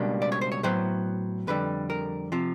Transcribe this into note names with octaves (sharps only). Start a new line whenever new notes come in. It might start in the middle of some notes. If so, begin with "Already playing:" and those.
Already playing: C#2 B2 G3 A#3 D4
D5
C#5
C5
C#5
A2 F#3 B3 C5
F2 D3 G3 B4
A#4
C3 F3